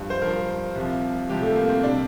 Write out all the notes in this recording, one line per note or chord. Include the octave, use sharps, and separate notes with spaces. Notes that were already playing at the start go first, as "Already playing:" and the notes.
Already playing: G2 F3
C5
G2 F3 A#4
C2 C3 F3
C2 C3 F3 G4
A3
A#3
C4
C3 G3 D4